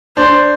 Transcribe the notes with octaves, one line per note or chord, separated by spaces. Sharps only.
D4 C5